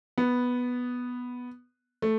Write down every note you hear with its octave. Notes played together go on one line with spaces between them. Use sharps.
B3
A3